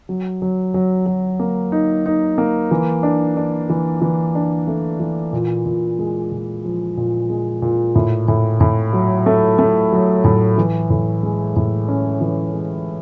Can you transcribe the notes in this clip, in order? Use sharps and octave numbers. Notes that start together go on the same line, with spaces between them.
F#3
F#3
F#3
F#3
A#3
D#4
D#4
A#3
E3
D4
D4
E3
E3
D4
A3
E3
A#2
A#2
G#3
A#2
F3
A#2
G#3
A#2
A2
A2
A2
F#3
A3
A3
F#3
A2
E3
A2
G#3
A2
C#4
E3
G#3